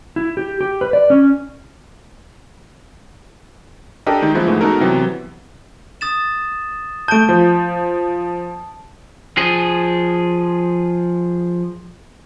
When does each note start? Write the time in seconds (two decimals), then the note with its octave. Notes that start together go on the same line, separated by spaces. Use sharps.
0.16 E4
0.37 G4
0.61 G4
0.81 B4
0.93 D5
1.10 C#4
4.06 D4 G4 A4 A#4 D#5
4.22 D#3 G#3 D#4
4.34 E3 F3 G#3 B3 E4
4.47 G#2 E3 G#3 A3
4.61 B3 D#4 F#4 A4 A#4
4.80 C3 E3 F#3 B3
6.01 D#6 A6 E7
7.08 A3 A5 G6 D7
7.29 F3
9.37 F3 G#4